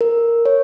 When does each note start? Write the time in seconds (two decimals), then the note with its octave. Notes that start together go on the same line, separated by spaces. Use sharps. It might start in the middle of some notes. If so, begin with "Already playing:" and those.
0.01 A#4
0.45 C#5